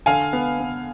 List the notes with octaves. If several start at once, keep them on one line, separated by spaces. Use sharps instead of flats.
D3 F5 G#5
B3
B3